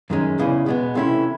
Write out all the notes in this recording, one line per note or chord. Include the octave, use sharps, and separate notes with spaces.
F#2 D#3 G#3 C#4
E2 C#3 E3 G#3 C#4
B2 G#3 B3
C3 E3 A3 C#4 E4